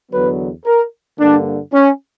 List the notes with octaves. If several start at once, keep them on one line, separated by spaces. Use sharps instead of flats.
E2 D3 F#3 B3 B4
A#4
G2 D3 A#3 D4
C#4